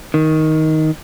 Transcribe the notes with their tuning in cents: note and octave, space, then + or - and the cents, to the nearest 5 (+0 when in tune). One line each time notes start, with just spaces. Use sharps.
D#3 +10